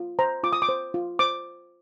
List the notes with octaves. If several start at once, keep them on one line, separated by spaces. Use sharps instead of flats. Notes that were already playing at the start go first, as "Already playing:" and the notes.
Already playing: F4
C5 A#5
F4 D6
D#6
D6
C5
F4
C5 D6